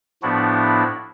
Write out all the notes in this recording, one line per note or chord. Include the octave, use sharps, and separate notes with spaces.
A2 F3 B3 D4 E4 F#4